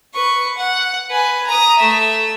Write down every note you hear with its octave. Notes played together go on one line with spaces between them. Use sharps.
B4 C#6
F#5
B4 G#5
A#5 D#6
A3 E5